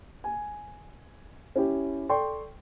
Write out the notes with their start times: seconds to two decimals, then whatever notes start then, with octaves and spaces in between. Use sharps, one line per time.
0.24 G#5
1.56 C#4 E4 G4
2.09 A4 D5 G5 C6 C#6